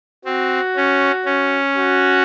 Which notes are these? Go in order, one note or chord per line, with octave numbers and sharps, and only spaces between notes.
C4 F#4
C#4
C#4
F#4